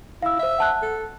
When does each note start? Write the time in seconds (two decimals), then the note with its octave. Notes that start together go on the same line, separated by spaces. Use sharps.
0.22 E4 F5 E6
0.39 C5 E5 E6
0.58 F#5 A5 F#6
0.82 A4